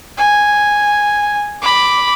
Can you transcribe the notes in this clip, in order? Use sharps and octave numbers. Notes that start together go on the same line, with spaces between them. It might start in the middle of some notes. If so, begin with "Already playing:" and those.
G#5
B5 D6